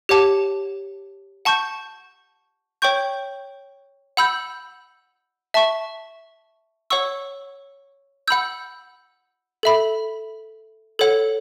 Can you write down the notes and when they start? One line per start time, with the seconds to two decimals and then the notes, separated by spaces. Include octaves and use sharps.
0.09 G4 C#5 F#5 A5 D6
1.45 F#5 A5 C#6 G6
2.82 C#5 G5 C#6 G6
4.17 F#5 B5 E6 G6
5.54 E5 A5 C#6
6.90 C#5 F#5 C#6 E6
8.28 F#5 B5 E6 G6
9.63 A4 E5 B5
10.99 A4 C#5 F#5